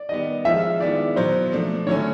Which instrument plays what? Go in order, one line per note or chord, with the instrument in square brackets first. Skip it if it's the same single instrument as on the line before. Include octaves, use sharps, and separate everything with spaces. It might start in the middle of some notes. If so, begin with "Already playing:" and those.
Already playing: [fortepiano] D5
[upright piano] D#3 G3 B3 [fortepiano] D#5
[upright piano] F3 G#3 C#4 F4 [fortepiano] E5
[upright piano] D#3 G#3 B3 E4 [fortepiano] D5
[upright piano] B2 F#3 B3 [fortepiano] C5
[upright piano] F3 A3 D4
[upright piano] D3 F#3 A3 C#4 [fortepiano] C#5